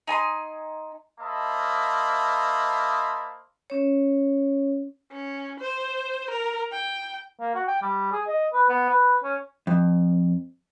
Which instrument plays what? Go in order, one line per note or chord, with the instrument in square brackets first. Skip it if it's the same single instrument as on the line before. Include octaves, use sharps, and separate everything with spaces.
[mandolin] D#4 G#5 A#5 C6
[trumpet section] A#3 C5 D#5 E5 A5 B5
[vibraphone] C#4 C#5
[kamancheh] C#4
C5
A#4
G5
[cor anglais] A#3
F#4
G5
G3
G#4
D#5
B4
B3
B4
C#4
[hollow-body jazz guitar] F2